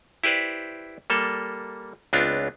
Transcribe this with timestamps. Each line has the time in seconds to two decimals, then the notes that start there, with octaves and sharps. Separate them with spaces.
0.24 E4 G4 B4 C5 D5
1.10 G3 A#3 A4
2.13 C#2 B3 C4 D4 F4